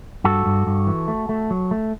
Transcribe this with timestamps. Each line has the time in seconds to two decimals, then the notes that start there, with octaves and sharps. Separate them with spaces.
0.24 G2 F#4 A4
0.46 G2
0.67 G2
0.87 E3
1.08 A3
1.29 A3
1.50 F#3
1.71 A3